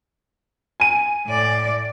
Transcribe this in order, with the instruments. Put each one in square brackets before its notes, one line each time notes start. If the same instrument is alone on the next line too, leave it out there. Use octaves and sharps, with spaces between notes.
[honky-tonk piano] G#5 D#7
[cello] A2 D5